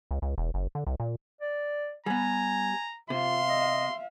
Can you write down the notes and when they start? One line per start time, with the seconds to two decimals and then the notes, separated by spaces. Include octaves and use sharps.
0.11 C#2
0.22 C#2
0.38 E1
0.54 F#1
0.75 D3
0.87 C2
1.00 A#2
1.41 D5
2.06 G3 B3 G#5 A#5
3.10 C3 F4 E5 F5 C6
3.48 D#5